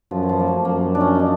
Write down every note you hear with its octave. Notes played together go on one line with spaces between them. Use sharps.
F#2 F3
E3
F3
A#3
A3
F#2 A#3
D4
C#4
D4 D#4